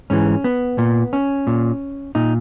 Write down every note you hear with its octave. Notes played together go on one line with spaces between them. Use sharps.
G#2 E3 C#4
B3
A#2
C#4
A#2
A#2 D#4